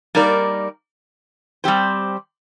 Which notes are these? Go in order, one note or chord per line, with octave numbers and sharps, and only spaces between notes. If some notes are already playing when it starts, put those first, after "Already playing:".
G3 A#3 D#4 A#4 D5
G3 C4 G4 C5